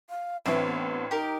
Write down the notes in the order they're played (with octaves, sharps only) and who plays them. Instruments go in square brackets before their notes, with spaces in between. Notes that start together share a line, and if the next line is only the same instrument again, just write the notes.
[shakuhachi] F5
[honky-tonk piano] A1 E3 [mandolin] C4 D4 C#5 [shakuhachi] E5
[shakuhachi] B3
[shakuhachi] D#4 [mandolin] G4 A#4